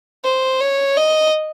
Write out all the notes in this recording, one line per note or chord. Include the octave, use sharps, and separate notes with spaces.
C5
C#5
D#5